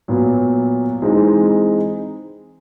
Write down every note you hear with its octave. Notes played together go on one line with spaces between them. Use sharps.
A#2 F#3 B3
E3 G#3 C4 D#4